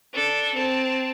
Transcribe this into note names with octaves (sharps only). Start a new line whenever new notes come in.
D4 A4
C4 A5